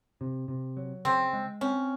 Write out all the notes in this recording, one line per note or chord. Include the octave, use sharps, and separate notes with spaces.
C3
C3
F#3
C#3 C4
G#3
C4 C#4